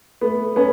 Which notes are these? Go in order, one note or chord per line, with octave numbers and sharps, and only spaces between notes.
A3 B3
B3 C#4